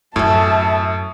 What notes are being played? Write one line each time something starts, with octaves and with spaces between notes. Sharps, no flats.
F#2 A2 A4 E5 G#5 A5